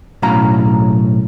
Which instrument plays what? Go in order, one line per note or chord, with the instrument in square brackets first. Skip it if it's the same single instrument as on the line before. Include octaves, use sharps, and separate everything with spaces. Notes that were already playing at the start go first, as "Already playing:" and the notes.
[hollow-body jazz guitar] B1 A2 F#3 C#4 F5 A#5